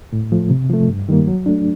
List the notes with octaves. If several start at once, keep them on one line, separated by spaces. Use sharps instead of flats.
A2
F3 A3
C3
F3 A3
G2
D#3 G3 A#3
F#3
A3 D4